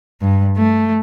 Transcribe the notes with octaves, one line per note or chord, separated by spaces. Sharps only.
G2
A3